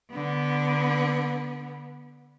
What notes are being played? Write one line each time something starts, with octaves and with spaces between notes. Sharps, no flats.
D3 B3